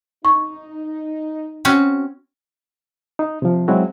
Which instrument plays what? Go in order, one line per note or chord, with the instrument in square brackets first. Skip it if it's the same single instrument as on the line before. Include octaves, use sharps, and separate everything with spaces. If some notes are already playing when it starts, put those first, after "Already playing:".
[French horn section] D#4 [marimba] C#6
[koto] C4 C#4 F#4
[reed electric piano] D#4
C3 F3
F#3 G#3 C4 E4 F#4